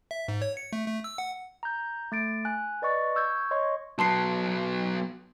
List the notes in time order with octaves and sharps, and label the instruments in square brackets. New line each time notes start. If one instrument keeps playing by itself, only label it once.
[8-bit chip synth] E5
G#2
C#5
C#7
A3
A3
E6
F#5
[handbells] A#5 G6
A3 A6 D7
G#5 F#6
B4 D5 D#5 C#6 A6
C#6 E6 G6 G#6
C#5 D#5 C6 C#6
[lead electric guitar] F#3 B3 [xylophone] A5 C6 C7